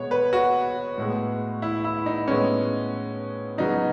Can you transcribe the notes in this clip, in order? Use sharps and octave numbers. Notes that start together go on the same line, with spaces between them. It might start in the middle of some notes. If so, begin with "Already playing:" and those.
Already playing: B2 G#3 B3 C#5
B4
F#4
A2 G#3 B3
E4
E4
D#4
A2 G#3 B3 C#4
C#3 F#3 B3 D#4